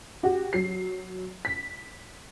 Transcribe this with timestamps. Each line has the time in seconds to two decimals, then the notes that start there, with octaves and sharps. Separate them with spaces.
0.23 F#4 G4
0.53 F#3 C7
1.45 B6